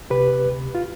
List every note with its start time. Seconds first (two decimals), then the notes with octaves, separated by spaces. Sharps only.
0.10 C3 G4 B4
0.46 D2
0.75 F4